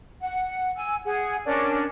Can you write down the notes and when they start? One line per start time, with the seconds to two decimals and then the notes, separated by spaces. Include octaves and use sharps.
0.21 F#5
0.76 G#5 E6
1.05 G#4 F#5
1.45 C#4 D4 A#4